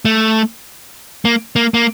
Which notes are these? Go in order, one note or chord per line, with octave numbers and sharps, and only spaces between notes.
A3
A#3
A#3
A#3